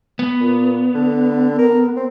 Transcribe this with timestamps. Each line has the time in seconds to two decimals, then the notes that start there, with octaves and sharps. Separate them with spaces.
0.19 B3
0.40 A#2
0.95 D3
1.58 A#4
1.96 C4